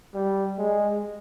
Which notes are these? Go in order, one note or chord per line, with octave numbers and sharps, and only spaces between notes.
G3
G#3